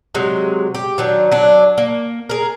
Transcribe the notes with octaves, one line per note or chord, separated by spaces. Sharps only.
C3 F#3 G#3
G4
D#3 F#3 D4
F#3 D4
A#3
G#4 A#4